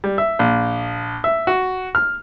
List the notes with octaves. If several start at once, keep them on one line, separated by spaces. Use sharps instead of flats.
G3
E5
A#1
E5
F#4
F6